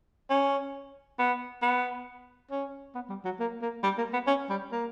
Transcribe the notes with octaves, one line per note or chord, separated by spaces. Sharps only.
C#4
B3
B3
C#4
B3
G3
F#3
A#3
A#3
G3
A#3
B3
C#4
G3
A#3